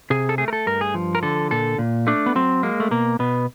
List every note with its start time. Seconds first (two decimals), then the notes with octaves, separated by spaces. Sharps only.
0.10 C3 G#4
0.29 A4
0.38 A3 G#4
0.48 A#4
0.53 A4
0.66 G2 A#4
0.81 G#4
0.94 F3
1.15 A#4
1.23 D3 A4
1.51 A#2 A4
1.78 A#2
2.07 A3 D4
2.26 B3
2.35 F#3 C4
2.63 G#3 A#3
2.80 A3
2.91 B2 A#3
3.19 B2 B3